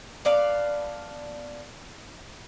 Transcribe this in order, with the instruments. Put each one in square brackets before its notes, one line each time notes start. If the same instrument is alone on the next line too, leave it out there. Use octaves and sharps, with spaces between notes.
[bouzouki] B3 D5 F5 A5